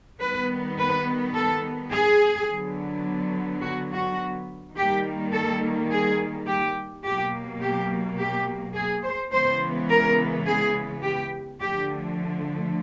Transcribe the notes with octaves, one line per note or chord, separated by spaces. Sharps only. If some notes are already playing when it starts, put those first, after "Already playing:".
D#3 G3 B3 B4
B4
A4
G#4
D3 F#3 B3
F#4
F#4
D#3 G3 A#3 G4
A4
G#4
G4
B2 F#3 A#3 G4
G4
G4
G#4
C5
C#3 E3 G#3 B3 C5
A#4
G#4
G4
D3 F3 A3 G4